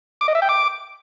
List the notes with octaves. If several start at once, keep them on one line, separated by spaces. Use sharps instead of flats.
D6
D#5
E5
G5
D6